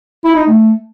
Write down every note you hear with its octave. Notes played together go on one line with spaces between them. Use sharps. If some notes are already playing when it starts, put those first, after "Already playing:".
E4
D#4
A3